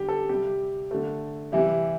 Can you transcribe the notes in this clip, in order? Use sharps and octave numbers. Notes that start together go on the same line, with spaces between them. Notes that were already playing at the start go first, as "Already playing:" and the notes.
Already playing: D3 G3 G4
A4
C3 G3 G4
D3 A3
C3 E3 G3 E4